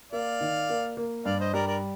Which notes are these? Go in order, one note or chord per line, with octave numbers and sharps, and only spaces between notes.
A#3 D5 F5
D#3
A#3
A#3
G2 D5 F5
C5 D#5
G3 A#4 D5
A#4 D5